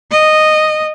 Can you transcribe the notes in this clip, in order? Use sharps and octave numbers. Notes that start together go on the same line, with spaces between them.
D#5